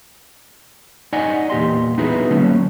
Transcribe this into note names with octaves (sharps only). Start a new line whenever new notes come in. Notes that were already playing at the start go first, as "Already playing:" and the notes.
D#4 D5 D#5 F#5 G#5
E2 A#2 G4 D#5 C6
B3 D#4 E4 F#4 G#4 B4
D3 F#3 A3 A#3 C#4